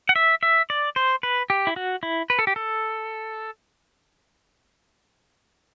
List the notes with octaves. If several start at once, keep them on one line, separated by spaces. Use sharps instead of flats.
F#5
E5
E5
D5
C5
B4
G4
E4
F#4
E4
B4
A4
G4
A4